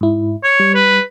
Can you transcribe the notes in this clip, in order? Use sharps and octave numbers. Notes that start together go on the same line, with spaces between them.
G#2 E4
C#5
G3
B4